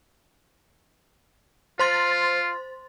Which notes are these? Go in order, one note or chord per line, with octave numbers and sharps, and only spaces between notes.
F4 C5 C6 A6